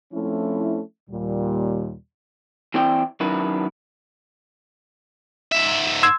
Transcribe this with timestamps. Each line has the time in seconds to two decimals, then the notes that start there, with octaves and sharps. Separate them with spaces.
0.13 F3 A3 C4 C#4 E4
1.10 D#2 A#2 G3
2.74 E3 C4 E4 D5 G5
3.20 F#2 D#3 D4 E4 B4
5.52 G#2 E5
6.03 C6 E6 G#6